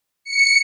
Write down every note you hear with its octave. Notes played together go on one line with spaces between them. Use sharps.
C#7